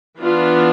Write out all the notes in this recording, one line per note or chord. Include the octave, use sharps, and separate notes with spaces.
E3 B3 D4 F4